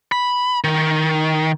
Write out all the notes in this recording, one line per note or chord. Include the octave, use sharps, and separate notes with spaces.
B5
D#3